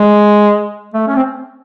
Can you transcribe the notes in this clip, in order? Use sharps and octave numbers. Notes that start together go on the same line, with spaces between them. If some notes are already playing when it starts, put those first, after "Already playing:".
Already playing: G#3
A3
C#4
C4